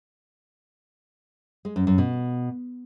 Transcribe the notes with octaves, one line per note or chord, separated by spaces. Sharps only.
G#3
F#2
F#2
B2